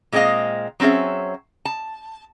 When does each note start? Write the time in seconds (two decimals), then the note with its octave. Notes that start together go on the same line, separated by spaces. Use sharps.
0.12 A#2 G#3 C4 C#4 D#5 F5
0.80 F#3 C4 C#4 G#4 E5
1.65 A5